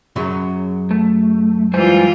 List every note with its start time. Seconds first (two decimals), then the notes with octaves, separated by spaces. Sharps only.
0.16 F#2 C#3 F#3
0.91 A3
1.74 E3 G3 G#3 F4 C5 G#5